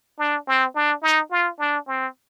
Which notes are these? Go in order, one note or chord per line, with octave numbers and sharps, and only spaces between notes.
D4
C4
D4
D#4
F4
D4
C4